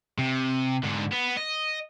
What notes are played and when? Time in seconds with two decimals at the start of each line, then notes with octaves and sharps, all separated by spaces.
0.18 C3
0.83 G#2 D3
1.12 B3
1.37 D#5